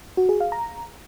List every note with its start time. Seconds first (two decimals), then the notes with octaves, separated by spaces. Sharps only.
0.17 F#4
0.29 G#4
0.40 F5
0.52 A#5